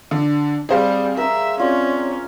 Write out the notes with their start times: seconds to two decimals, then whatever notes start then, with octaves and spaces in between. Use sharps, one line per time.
0.11 D3 D4
0.69 G3 C4 G#4 C5 F5
1.17 A#4 E5 E6
1.59 C4 C#4 F4 D5